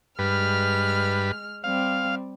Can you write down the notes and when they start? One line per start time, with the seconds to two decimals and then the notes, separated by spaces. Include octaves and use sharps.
0.19 G2 G#3 B4 F6
1.64 G3 C4 F5